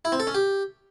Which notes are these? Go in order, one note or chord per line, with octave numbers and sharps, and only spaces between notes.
E4
C4
A4
C#4
G4